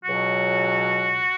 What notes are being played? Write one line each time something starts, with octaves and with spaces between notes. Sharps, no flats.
C#2 B2 F#3 F#4